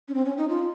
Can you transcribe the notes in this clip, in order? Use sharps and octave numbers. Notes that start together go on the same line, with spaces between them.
C#4
C4
C#4
D#4
F4